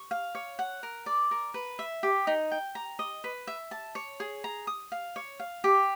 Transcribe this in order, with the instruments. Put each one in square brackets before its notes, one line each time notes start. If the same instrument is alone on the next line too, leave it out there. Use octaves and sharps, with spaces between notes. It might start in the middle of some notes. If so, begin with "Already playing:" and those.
Already playing: [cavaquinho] C#6
F5
C#5
F#5
A#4
D5
A#4
B4
E5
G4
D#4
G5
A#5
D#5
B4
E5
A5
C#5
G#4
A#5
D#6
F5
C#5
F5
G4